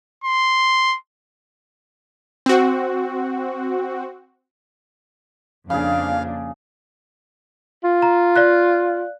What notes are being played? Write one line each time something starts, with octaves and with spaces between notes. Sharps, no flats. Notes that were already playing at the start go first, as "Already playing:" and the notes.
C6
C4 F#4
F2 C#3 A#3 D4 G#4 F5
F4
A#5
D5 F5 F#6